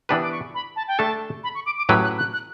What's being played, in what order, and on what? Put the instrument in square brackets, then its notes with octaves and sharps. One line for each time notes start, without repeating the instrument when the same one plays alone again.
[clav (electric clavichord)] E3 B3 D4 G4 B4 [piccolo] B5
[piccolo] D6
C#6
B5
A5
G5
[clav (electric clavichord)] A3 D4 A4 [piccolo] A5
[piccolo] B5
C#6
D6
D6
[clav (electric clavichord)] A2 F#3 C#4 G4 B4 [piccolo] E6
[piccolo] F#6
F#6
F#6